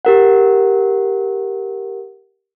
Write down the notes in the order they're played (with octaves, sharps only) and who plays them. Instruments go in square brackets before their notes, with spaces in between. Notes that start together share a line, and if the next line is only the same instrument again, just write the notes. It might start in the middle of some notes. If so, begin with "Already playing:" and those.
[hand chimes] G4 A#4 F#5